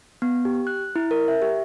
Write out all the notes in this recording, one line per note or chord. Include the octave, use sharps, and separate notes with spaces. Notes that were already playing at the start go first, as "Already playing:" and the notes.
B3
G4
F#6
E4
A#4
E5
G4